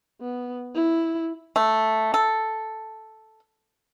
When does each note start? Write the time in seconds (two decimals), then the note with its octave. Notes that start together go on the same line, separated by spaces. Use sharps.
0.21 B3
0.74 E4
1.56 A3
2.14 A4